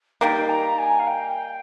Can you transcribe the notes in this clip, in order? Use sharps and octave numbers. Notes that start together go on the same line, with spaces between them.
D#3 G3 A#3 G5
A#5
G#5
F5
G5
G5